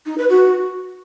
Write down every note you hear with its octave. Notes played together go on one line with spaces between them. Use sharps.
D#4
B4
F#4